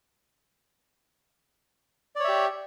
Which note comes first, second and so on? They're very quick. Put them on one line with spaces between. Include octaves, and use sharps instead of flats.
D5 C#5 E5 G4